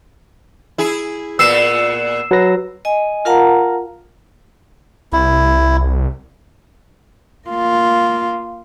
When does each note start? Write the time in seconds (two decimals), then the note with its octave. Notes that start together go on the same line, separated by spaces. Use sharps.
0.78 E4 G#4
1.39 A#2 B3 E6 C7 E7
2.31 F#3 B4 A#6
2.85 D#5 G#5
3.25 F4 A#4 F5 F#5 A5 A#5
5.13 C2 E4
7.48 A#3 F4